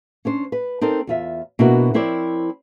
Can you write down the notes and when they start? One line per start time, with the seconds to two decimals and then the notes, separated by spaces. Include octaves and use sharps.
0.25 C#4 D4 C5
0.52 B4
0.81 C4 D#4 A4 A#4
1.07 E2 F4 E5
1.59 B2 A#3 D4 E4 F#4 A#4
1.94 F3 C4 E4 A#4 C#5 D5